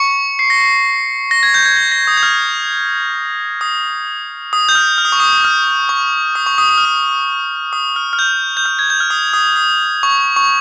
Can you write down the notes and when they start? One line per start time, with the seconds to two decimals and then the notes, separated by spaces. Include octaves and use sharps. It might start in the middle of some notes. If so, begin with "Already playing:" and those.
Already playing: C#6 C#7
0.39 C7
0.50 A#6
0.60 C7
1.31 A#6
1.43 G#6
1.54 G6
1.66 G#6
1.77 A#6
1.92 A#6
2.07 D#6
2.17 G6
2.23 F6
3.61 D#6
4.53 D#6
4.69 G6
4.75 F6
4.98 F6
5.05 D#6
5.12 C#6
5.20 D#6
5.45 F6
5.89 C#6
6.35 D#6
6.46 C#6
6.58 D#6
6.70 D#6
6.78 F6
6.85 D#6
7.73 D#6
7.96 F6
8.13 F6
8.19 G6
8.57 G6
8.66 F6
8.79 G#6
8.90 G6
9.00 F6
9.10 D#6
9.33 D#6
9.56 D#6
10.03 C#6
10.36 C#6